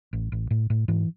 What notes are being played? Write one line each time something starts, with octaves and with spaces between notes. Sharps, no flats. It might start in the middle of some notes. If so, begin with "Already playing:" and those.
A1
A1
A2
A2
G#2 E3